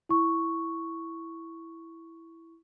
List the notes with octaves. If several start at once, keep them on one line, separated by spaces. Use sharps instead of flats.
E4 C#6